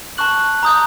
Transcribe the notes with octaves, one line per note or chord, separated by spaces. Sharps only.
A5 C#6 F#6 F#7
A#5 D#6 G6